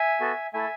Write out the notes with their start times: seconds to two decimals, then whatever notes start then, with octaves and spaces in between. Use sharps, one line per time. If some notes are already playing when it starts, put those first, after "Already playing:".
Already playing: E5 G#5
0.21 B3 F#4 A4
0.54 A3 E4 A4 E5 G#5